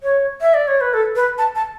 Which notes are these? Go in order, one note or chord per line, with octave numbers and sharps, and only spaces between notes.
C#5
E5
D5
C#5
B4
A4
B4
A5
A5